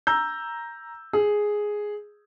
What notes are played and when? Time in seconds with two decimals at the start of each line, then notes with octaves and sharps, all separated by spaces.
0.07 A#5 E6 G6
1.13 G#4